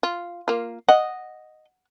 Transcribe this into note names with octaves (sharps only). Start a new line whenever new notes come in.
F4
A#3 F4
D#5 F#5